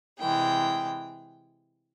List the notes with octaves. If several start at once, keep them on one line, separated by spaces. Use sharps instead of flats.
C3 E3 G#3 G5